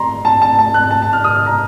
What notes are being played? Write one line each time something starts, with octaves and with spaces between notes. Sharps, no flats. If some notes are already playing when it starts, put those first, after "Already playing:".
Already playing: A#5 C6
A5
A5
A5
F#6
A5
A5
F6
D#6
F6
A#5